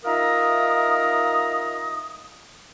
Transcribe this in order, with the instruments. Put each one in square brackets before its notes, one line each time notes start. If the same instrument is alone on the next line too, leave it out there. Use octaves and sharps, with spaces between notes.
[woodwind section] D#4 F4 A#4 E5 A#5 D#6